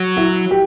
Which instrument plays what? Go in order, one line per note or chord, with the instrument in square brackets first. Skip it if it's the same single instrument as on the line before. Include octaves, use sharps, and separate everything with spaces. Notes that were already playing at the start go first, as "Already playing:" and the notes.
Already playing: [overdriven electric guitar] F#3
[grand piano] E4 F#4
G4